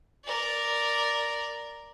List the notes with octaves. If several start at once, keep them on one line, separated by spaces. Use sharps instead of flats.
A#4 D5